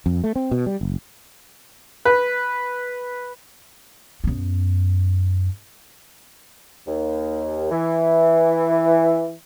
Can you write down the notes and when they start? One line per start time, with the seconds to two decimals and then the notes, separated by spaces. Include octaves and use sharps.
0.06 F2
0.24 A3
0.36 C4
0.51 B2
0.66 G3
0.81 F#1
2.05 B4
4.24 F#2 B3
6.87 D#2
7.71 E3